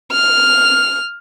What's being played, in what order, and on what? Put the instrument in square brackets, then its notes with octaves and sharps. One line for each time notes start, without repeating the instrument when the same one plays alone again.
[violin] F6